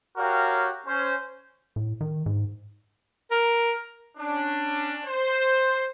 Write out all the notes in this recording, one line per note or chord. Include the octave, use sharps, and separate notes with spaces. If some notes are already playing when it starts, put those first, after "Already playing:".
F#4 G4 A#4 C#5 F5 G5
C#4 C5
A2
D#3
G#2
A#4
C#4 D4
C5